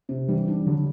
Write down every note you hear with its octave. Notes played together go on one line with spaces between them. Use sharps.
C3
E3 G3 D4
D4
D3 F#3 G3